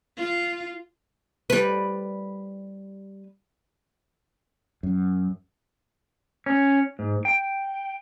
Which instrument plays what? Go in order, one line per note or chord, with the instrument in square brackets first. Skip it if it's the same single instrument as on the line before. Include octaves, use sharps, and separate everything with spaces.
[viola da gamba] F4
[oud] G3 B4
[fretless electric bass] F#2
[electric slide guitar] C#4
G#2
G5